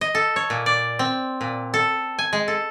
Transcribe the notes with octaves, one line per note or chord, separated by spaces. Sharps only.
D#5
A4
C#5
A#2
D5
C4
A#2
A4
G#5
G#3
A4